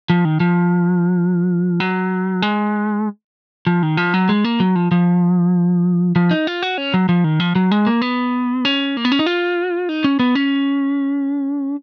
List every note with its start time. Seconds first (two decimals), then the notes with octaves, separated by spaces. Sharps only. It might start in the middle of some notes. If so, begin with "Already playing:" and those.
0.10 F3
0.25 D#3
0.40 F3
1.80 F#3
2.42 G#3
3.67 F3
3.83 D#3
3.97 F3
4.14 F#3
4.29 G#3
4.44 A#3
4.60 F#3
4.75 F3
4.91 F3
6.16 F3
6.31 D#4
6.47 F4
6.62 F#4
6.78 C#4
6.94 F#3
7.09 F3
7.24 D#3
7.40 F3
7.55 F#3
7.71 G#3
7.87 A#3
8.02 B3
8.65 C#4
8.97 A#3
9.05 B3
9.12 C#4
9.19 D#4
9.26 F4
9.89 D#4
10.04 C#4
10.19 B3
10.35 C#4